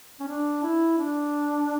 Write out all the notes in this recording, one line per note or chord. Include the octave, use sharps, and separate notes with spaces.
C#4
D4
E4
D4